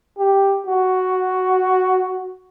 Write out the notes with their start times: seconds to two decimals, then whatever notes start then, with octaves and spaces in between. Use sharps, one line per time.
0.18 G4
0.67 F#4